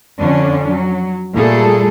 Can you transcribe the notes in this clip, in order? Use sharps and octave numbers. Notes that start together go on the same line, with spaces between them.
F2 D3 C#4 D4
F#3
A#2 G3 A3 G#4 A4